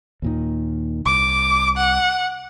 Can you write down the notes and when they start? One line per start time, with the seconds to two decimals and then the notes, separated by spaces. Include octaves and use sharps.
0.22 D#2 A#2 D#3
1.06 C2 D6
1.77 F#5